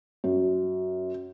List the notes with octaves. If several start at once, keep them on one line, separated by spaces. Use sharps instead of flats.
F#2